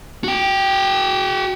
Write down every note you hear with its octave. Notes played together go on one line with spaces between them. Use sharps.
F#4 G5